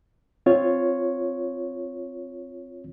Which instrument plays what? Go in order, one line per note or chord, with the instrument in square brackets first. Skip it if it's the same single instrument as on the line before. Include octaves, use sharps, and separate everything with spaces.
[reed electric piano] C4 F4 C#5